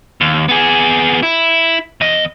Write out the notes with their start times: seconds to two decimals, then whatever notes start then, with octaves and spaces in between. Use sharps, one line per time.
0.21 D#2
0.49 B3 G#4
1.23 E4
2.01 E2 D#5